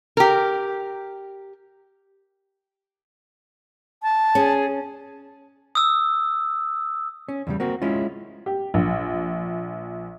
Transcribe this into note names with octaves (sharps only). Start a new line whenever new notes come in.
G4 A#4
A5
C#4 G#4
D#6 E6
C#4
E2 C#3 G3
A#3 C4 F#4
G#3 C#4 E4 F4
G4
A#1